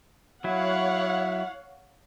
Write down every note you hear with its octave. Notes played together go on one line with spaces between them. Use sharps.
F#3 E4 C#5 F5 F#5